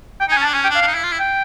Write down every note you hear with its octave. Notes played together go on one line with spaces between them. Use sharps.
G5
D#4
G#5
C#4
A5
D4
C#4 G#5
G5
D4
F5
D4
D#4
E4
F4
E4
G5